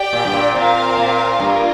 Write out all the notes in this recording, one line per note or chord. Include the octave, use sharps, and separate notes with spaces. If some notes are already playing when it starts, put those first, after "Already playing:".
Already playing: G4 D5 G5
A#2
G2
A#2
A#2 C4 F4 A#4 F5
A#2
G2 A#3 F4 A#4